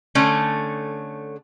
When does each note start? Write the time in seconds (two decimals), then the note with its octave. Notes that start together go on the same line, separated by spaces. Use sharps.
0.15 D3 A3 C#4 A4